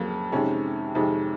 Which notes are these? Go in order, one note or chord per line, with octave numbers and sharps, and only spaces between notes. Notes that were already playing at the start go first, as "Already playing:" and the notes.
Already playing: F2 C#3 F#3 A#3
F2 C3 D#3 G#3 C#4
F2 C3 D#3 G#3 D#4